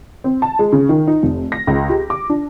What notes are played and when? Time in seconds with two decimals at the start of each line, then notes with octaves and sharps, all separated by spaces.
0.24 C4
0.42 A5
0.59 G#3
0.73 C#3
0.89 D#3
1.07 D#4
1.23 F1
1.52 A#6
1.67 C#2
1.90 G4
2.10 D6
2.30 D4